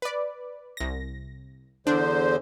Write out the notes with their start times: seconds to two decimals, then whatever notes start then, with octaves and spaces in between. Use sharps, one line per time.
0.02 B4 D5
0.77 C2 A#6
1.87 E2 D3 D4 C5